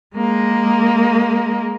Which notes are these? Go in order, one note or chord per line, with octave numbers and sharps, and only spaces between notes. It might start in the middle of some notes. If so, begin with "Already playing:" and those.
G#3 A#3